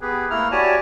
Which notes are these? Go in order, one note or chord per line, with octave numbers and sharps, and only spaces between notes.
B3 G4 G#4 B4
A3 A#3 E4 A4 A#5 F6
F#4 G4 C#5 D5 G#5 A5